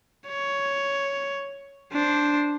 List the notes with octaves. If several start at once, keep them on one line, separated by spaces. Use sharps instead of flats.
C#5
D4 C5